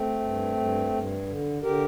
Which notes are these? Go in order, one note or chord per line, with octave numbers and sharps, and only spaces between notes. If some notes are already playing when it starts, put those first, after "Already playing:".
Already playing: A3 C4
G2
G2
G2
D3
D3 G4 A#4